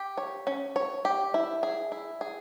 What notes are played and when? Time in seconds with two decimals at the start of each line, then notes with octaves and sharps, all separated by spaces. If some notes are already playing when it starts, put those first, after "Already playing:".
Already playing: G4
0.18 C#5
0.47 C#4
0.76 C#5
1.05 G4
1.34 E4
1.63 G#4
1.92 E4
2.21 G#4